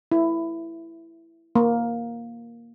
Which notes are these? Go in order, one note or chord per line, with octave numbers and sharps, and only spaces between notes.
E4
A#3